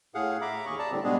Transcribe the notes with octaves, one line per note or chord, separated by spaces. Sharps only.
A2 G#4 F5 F#5
E5 A#5 B5 D6
D#2 G#4 C#6
D5 A5 A#5
A2 D3 G3 C4
B2 G3 G#3 B3 D4 G#4